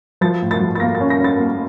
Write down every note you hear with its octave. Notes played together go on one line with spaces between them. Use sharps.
F3 A6
A2
A6
F3
A6
A#3 A#6
A6
C#4
A#6
C#4 A6
A#3